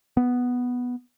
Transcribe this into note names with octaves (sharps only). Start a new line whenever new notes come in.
B3